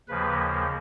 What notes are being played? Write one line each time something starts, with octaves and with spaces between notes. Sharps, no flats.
D#2 C#3 F3 A#3 B4